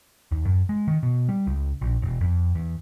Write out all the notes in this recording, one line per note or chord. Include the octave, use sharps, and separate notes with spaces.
D#2
F#2
G#3
D#3
B2
G3
C#2
A#1
E1
F2
E2